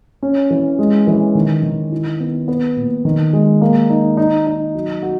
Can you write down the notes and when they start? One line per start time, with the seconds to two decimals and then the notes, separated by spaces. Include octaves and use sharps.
0.22 C#4
0.50 E3
0.79 G#3
1.07 E3
1.35 D#3
1.63 D#3
1.92 E4
2.20 B3
2.48 B3
2.76 A#2
3.05 D#3
3.33 G#3
3.61 A#3
3.90 D#4
4.17 D#4
4.47 D#4
4.74 F#3
5.02 F#4